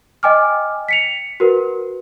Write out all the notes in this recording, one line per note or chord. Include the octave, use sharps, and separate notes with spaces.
D#5 G5 G#5 D6 F6
B6 C#7 F7
F#4 A#4 B4